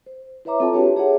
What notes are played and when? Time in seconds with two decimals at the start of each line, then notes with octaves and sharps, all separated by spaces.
0.06 C5
0.45 E4 B4 C#5 E5 A#5 D6
0.60 C4 F4 A4 E5 G5 A5
0.73 D4 F#4 G4 B4 C#5
0.96 G#4 C#5 E5 F#5